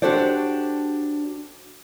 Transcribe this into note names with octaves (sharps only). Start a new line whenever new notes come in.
D4 F#4 G4 A4 C5 D5